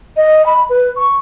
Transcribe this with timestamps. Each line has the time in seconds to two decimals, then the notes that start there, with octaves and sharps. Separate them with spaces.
0.17 D#5
0.46 B5
0.69 B4
0.97 C#6